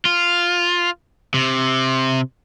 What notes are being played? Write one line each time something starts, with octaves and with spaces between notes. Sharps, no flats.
F4
C3